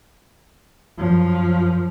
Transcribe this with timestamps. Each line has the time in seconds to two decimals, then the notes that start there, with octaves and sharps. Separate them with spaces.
0.98 F#2 F3